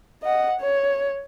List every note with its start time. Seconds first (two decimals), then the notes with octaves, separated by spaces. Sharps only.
0.23 D#5 F#5
0.61 C#5